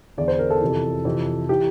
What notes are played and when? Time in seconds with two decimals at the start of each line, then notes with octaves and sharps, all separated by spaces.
0.17 E2 D3 D5
0.28 C5
0.39 A#4
0.50 A4
0.61 F2 C3 E3
1.05 F2 C3 E3
1.49 E3 G4